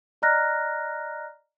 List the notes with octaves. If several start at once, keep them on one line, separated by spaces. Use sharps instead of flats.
D5 D#5 A#5 F6 F#6 A#6